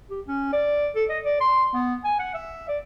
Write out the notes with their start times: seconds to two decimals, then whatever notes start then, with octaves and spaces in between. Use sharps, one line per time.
0.10 G4
0.28 C#4
0.53 D5
0.96 A4
1.10 D#5
1.25 D5
1.41 C6
1.75 B3
2.04 G#5
2.19 F#5
2.34 E5
2.69 D5